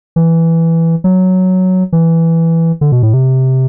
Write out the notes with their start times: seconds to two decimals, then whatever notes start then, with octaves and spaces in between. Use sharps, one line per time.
0.16 E3
1.04 F#3
1.92 E3
2.81 D3
2.92 B2
3.03 A2
3.14 C3